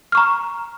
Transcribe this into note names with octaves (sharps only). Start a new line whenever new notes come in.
A#5 C#6 F6